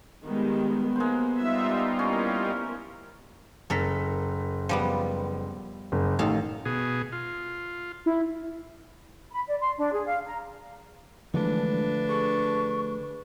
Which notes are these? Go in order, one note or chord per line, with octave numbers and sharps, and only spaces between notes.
D#3 G3 G#3 B3
G#3 A#3 C5
G3 D#4 F4 E5
A#3 C#4 E4 A#4
F#1 A4 A#4 B6
F3 G3 B3
F#1
A1 D#3 A4 F5
B2 G#4
F4
E4
B5
D5
C6
D4
G#4
F5
A#5
D3 E3 F3 G#3 A3 D4 B4
G#4 A4 C#6